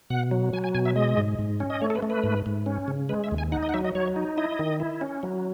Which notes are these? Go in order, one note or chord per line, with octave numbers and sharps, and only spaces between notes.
B2 F#5
F#3
F#3 G#5
G#5
B2 G#5
E5
G#3 D#5
G#2
G#2
C#4
D#5
A3 C#5
A4
B4
A3
B4
G#2
G#2
C#4
C#3
G#3 B4
E5
D#2
G#5
D#4 F#5
D#5
F#5
F#3 E5
D#5
F#3 C#5
D#4
E4 D#5
D#3
E4
C#4
F#3